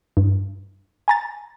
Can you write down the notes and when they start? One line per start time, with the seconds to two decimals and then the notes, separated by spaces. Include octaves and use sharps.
0.17 G2
1.08 G#5 A#5 A6